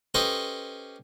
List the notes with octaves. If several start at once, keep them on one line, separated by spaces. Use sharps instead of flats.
C#4 G4 A4 B4 C5 D#5